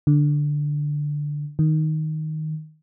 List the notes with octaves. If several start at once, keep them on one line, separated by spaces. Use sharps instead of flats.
D3
D#3